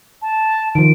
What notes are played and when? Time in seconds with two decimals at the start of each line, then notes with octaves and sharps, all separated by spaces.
0.22 A5
0.75 D#3 F3 D7